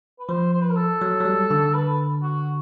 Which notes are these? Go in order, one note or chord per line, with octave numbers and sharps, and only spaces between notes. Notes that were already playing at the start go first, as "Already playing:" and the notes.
B4
F3 C5
C5
B4
A#4
A4
F#3
F#3
G3
D3
B4
F#4